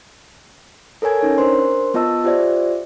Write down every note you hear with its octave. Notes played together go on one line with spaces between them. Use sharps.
A4 A#4 C#5 G#5 G#6
C#4 D#4 C#5
D4 A#4 C5 C6
B3 F4 D#5 A5 E6
F4 G4 C5 D5 E5